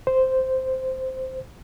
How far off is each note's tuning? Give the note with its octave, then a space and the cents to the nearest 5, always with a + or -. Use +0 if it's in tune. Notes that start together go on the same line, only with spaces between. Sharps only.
C5 -5